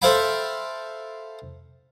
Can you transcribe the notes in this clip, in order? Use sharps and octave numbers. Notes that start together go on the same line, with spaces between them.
A4 C5 E5 F5 G5 B5